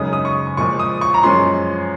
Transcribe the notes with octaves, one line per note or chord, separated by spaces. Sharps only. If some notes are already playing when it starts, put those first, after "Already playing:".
Already playing: F#2 C#3 G#3 D#4 D#6
D#6
C#6
A#2 F3 G#3 C#6
D#6
C#6
A#5
F#2 F3 G#3 C#4 C6